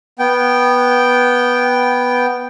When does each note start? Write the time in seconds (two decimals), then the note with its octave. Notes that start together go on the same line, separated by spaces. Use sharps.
0.19 B3 G5